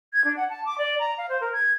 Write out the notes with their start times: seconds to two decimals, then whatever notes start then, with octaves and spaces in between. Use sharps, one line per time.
0.13 G#6
0.24 D4
0.37 F#5
0.49 A5
0.65 D6
0.78 D5
0.99 A#5
1.18 F5
1.29 C5
1.41 A#4
1.53 G#6